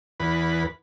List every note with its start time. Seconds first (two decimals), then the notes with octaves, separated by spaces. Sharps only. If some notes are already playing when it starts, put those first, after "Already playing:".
0.20 E2 B4